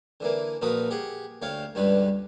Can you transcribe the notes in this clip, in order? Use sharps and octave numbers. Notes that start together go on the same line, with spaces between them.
D3 E3 A#3
A#1 F3 F#4 A#4 B4 D#6
G4 G#4 F#5
D2 C#5 F5 G5
C#2 G2 D3 B4